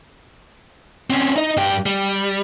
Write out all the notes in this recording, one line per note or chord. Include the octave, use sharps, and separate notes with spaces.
C4 C#4
D#4 D#5
G2 G4
G3